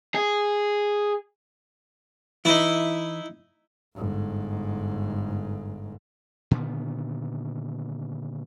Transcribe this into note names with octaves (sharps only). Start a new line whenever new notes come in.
G#4
E3 D#4 E4
G1 G#2
A#2 D3 D#3 B3